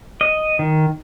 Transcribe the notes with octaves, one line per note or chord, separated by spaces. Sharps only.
D#5
D#3